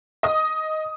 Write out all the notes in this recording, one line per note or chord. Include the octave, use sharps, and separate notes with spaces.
D#5 D#6